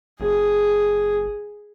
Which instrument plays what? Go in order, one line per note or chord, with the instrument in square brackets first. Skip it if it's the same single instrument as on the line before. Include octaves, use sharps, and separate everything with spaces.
[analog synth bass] F#1 [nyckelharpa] G#4